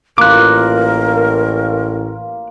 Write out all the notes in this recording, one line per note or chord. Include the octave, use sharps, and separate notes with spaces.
A1 A#3 F4 A#4 D6 F#6